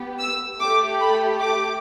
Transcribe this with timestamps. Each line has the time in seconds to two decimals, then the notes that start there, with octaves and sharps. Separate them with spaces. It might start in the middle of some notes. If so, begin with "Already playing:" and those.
Already playing: B3 G4
0.19 E6
0.59 A3 G4 D6
1.00 B5
1.41 D6